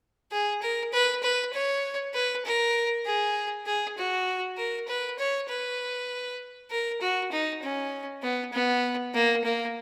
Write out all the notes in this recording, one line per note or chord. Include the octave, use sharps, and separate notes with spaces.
G#4
A#4
B4
B4
C#5
B4
A#4
G#4
G#4
F#4
A#4
B4
C#5
B4
A#4
F#4
D#4
C#4
B3
B3
A#3
A#3